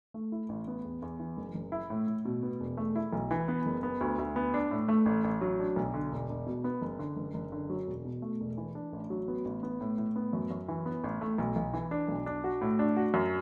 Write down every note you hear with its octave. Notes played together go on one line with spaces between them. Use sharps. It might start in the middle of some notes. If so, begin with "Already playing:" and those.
A3
E4
A1
B3
E2
E2
E3
F#1
F#1
E4
A2
A2
B2
B3
E1
A3
E4
B1
E3
B3
F#1
B3
D2
D2
B3
D4
A2
A3
A1
A1
F#3
D4
B1
D3
E1
E1
B2
B3
F#1
D3
F#1
F#1
D3
F#3
E1
B2
A3
E1
E3
D4
A1
F#3
B3
A1
B3
A2
A2
B3
F#2
F#2
E3
B3
A1
A3
B1
B1
E3
D4
B1
D4
F#4
A2
D4
F#4
F#2